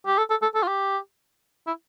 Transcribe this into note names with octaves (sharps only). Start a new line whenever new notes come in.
G4
A4
A4
A4
A4
F4
G4
E4